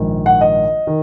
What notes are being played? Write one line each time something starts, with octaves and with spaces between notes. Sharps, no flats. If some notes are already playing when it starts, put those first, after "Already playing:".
Already playing: A#1 G#2 D#3
F#5
D#5
D#3